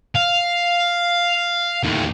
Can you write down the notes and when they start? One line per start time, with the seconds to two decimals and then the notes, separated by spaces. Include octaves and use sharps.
0.15 F5
1.83 D#2 A2